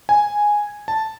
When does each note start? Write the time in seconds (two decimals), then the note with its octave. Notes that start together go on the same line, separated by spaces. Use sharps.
0.09 G#5
0.88 A5